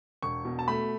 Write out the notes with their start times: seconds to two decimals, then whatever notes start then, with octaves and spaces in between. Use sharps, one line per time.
0.22 E1 C#6
0.45 B2
0.59 A5
0.68 A3 B5